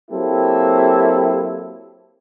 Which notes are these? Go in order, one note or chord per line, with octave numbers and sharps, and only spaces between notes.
F#3 A#3 C4 E4 G4 A4